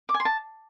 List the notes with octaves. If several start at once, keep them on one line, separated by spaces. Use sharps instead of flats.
D6
G#5
C6
A5